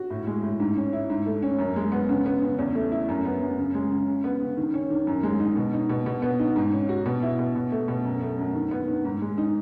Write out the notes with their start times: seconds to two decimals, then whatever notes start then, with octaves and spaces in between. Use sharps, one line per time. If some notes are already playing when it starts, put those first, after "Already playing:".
Already playing: F#4
0.10 A2
0.27 G#3
0.43 A2
0.60 G#2
0.76 C#4
0.93 E4
1.10 G#2
1.26 A3
1.42 C#4
1.59 F#2
1.76 G#3
1.92 B3
2.09 C#3
2.26 B3
2.42 C#3
2.59 E2
2.75 A3
2.92 E4
3.09 F#2
3.25 B3
3.42 F#2
3.58 C#3
3.75 G#3
3.91 C#3
4.08 C#3
4.24 B3
4.41 C#3
4.57 D#3
4.74 C#4
4.90 D#3
5.07 F#2
5.23 G#3
5.40 D#4
5.56 B2
5.73 D#4
5.89 B2
6.06 B2
6.22 B3
6.40 D#4
6.56 G#2
6.72 C#4
6.89 F#4
7.06 B2
7.22 E4
7.39 B2
7.56 B2
7.72 A3
7.88 B2
8.05 F#2
8.22 A3
8.38 F#2
8.55 D#3
8.71 B3
8.88 D#3
9.05 G#2
9.22 G#3
9.38 D#4